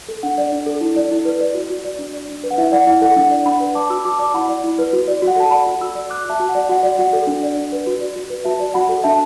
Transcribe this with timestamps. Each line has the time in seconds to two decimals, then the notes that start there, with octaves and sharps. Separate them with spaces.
0.08 A4
0.23 D4 F#5
0.38 D5
0.52 D4
0.66 A4
0.81 E4
0.96 D5
1.11 E4
1.25 B4
1.41 D5
1.54 F#4
1.70 F#4
1.85 D5
1.99 D4
2.13 D5
2.29 D4
2.44 B4
2.51 F#5
2.58 E4 E5
2.72 D5 F#5
2.86 E4 F#5
3.02 A4 F#5
3.16 D4 F#5
3.31 D5
3.45 D4 F#5 B5
3.60 B4
3.75 D5 A5 D6
3.90 F#4 B5 E6
4.05 F#4 A5 D6
4.19 D5 A5 D6
4.34 E4 F#5 B5
4.49 D5
4.64 E4
4.79 B4
4.93 F#4
5.08 D5
5.22 F#4
5.27 F#5
5.36 A4 A5
5.51 D5 F#5 B5
5.67 F#4
5.80 F#4 B5 E6
5.95 D5
6.10 D5 D6 F#6
6.25 F#4 E5 A5
6.40 F#4
6.49 F#5
6.55 D5
6.69 F#4 F#5
6.83 D5
6.98 F#4 F#5
7.13 A4
7.27 D4
7.43 D5
7.56 D4
7.72 B4
7.87 F#4
8.01 D5
8.16 F#4
8.30 B4
8.45 F#4 E5 A5
8.60 D5
8.74 F#4 F#5 B5
8.89 A4
9.04 D4 E5 A5